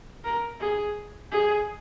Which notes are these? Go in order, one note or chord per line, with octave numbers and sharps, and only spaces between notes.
A#4
G#4
G#4